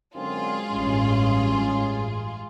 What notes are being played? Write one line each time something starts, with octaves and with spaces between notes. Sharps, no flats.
F#2 D3 G#3 C4 F4 G#4
A1 G2 C#4